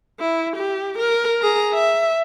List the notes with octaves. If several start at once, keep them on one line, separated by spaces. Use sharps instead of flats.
E4
G4
A#4
G#4 A#5
E5